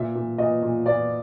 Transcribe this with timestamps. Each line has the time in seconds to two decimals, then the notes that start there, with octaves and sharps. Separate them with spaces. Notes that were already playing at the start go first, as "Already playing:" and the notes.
Already playing: A#2 E5
0.15 A#2
0.38 A#2 D#5
0.63 A#2
0.86 A#2 D5